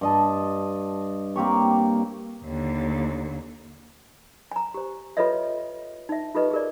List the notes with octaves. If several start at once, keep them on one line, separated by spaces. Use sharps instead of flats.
G2 D#5 A5
A#3 C4 G4 C#5
D#2 D3
G#5 A#5
G4 C5
F4 A4 B4 C#5 D#5 E5
D#4 E5
D#4 F4 G4 A4 B4 D#5
G#4 A#4 D5